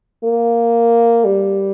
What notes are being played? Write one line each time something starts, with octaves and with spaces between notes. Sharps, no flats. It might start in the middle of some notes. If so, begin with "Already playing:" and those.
A#3
G3